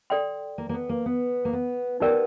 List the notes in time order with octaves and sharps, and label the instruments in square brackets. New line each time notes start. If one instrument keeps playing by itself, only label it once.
[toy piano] A4 D5 G5 C6
[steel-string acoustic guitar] A#3
A#3
B3
A#3
B3
A#3
B3
[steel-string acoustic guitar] B3 [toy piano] D#4 G4 A#4 D5 G5